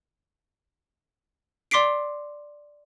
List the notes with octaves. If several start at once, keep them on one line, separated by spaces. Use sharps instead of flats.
D5 C6 D6 B6 C7 D7